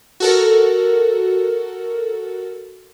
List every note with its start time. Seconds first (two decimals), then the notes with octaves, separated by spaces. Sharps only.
0.20 F#4 A4 A#4